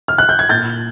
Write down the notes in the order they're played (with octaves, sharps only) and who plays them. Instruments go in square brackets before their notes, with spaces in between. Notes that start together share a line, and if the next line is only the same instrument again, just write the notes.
[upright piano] F6
F#6
G6
G#6
A#2 G6 A6